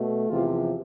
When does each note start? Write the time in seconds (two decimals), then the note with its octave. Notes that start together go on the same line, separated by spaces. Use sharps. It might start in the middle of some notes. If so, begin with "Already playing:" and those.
Already playing: B2 A3
0.29 E2 C3 F3 F4